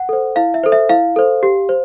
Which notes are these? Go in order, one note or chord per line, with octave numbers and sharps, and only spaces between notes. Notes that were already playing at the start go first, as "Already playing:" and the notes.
Already playing: F#5
A4 C5
E4 F5
E5
A4 C5
E5
E4 F5
A4 C5
G4
C5